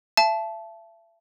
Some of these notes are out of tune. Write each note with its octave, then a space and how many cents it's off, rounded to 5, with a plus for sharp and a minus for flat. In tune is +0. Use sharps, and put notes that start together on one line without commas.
E5 +35 A5 -15